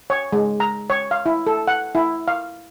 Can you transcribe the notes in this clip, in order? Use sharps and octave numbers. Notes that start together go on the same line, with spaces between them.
C#5
G#3
A#5
C#5
F5
E4
A4
F#5
E4
F5